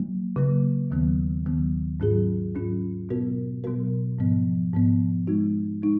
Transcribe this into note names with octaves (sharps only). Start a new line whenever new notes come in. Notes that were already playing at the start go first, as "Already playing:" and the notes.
Already playing: F#3 A#3
C#3 F#3 A#3
D#2 D#3 F#3 B3
D#2 D#3 F#3 B3
G#2 F#3 C#4 F4 G#4
G#2 F#3 C#4 F4 G#4
B2 F#3 B3 F#4 A#4
B2 F#3 B3 F#4 A#4
G#2 F3 B3
G#2 F3 B3
G#3 D#4 F#4
G#3 D#4